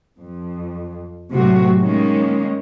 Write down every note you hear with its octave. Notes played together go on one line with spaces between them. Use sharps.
F2
A2 C3 F#3 A3 F#4
D#3 G#3 A#3 C#4